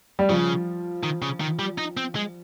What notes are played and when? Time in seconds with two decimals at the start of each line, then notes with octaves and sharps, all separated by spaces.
0.19 G3
0.30 C#3 F3
1.03 D#3
1.22 C#3
1.40 D#3
1.59 G3
1.78 D#4
1.97 C4
2.16 G#3